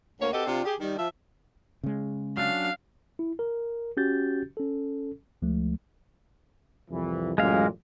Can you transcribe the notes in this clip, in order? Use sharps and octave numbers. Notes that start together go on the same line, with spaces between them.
D2 A#3 C#5
C4 F#4 G4 A4 B4 D#5
C3 C4 D4 F4
G4 G#4
D#3 G3
F3 E5
C#3 G#3
F#3 C#4 D4 F5
E4
A#4
C#4 F#4 G4 G6 A6
C#4 A4
D2 F3 G#3 A3
C2 F2 E3
A1 F#2 A#2 G#3 F5